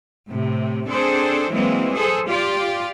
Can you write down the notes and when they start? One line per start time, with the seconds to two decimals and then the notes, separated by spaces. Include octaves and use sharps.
0.30 A2 C3
0.90 C4 D4 G#4 A4 C5
1.52 E3 F#3 G#3 A#3 C4
1.94 G#4 A4 C5
2.28 F4 G4 D5